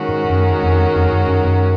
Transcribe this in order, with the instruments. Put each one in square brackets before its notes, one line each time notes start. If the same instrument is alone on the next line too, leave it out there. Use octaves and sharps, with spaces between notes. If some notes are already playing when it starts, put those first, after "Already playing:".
Already playing: [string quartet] D#3 G#3 C#4 F#4 A#4
[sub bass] G#2
F#2
F2
F2
F#2
F#2
F#2